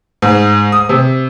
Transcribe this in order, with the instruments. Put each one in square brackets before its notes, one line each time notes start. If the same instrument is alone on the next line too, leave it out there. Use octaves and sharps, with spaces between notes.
[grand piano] G#2
D#6
C3